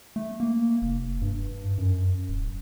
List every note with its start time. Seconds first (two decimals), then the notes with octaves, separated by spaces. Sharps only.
0.16 A3
0.40 A#3
0.82 F1
1.22 G2
1.78 F#2
2.29 D1